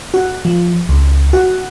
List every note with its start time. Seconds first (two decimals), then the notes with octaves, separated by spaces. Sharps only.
0.14 F#4
0.45 F3
0.89 C#2
1.33 F#4